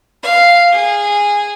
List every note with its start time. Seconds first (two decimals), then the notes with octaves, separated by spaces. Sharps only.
0.23 F5
0.72 G#4